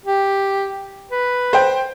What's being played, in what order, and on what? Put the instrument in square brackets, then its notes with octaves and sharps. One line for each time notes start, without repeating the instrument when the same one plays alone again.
[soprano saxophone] G4
B4
[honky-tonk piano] C5 G5